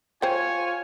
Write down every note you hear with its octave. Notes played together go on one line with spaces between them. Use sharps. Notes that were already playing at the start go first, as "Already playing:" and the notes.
F4 C5 C#5 G5 G#5